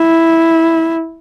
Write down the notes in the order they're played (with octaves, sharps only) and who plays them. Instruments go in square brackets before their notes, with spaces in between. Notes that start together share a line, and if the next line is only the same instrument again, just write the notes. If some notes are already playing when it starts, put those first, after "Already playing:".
Already playing: [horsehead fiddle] E4